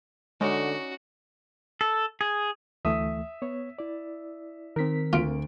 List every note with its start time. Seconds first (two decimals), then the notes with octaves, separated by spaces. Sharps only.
0.41 D3 G#3 C#4 D#4 F#4 D5
1.81 A4
2.21 G#4
2.85 D2 E3 A3 E5 D#6
3.42 B3 C#5
3.79 E4 D5
4.76 D#3 C4 A#4 B6
5.13 D2 F4 D7